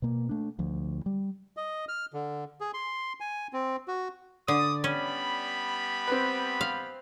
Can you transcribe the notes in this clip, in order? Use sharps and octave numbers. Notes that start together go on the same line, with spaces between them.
B2 A#3
A3 D4
D2 F3
G3
D#5
F6
D3
G#4
C6
G#5
C4
F#4
D3 D5 D#6
G3 B3 C#4 B5
C4 B4
F5